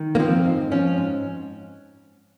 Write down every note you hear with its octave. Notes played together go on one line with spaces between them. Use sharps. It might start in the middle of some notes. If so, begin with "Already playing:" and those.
Already playing: D#3
A#3
F3 C4
G#2
F3 C#4
G#2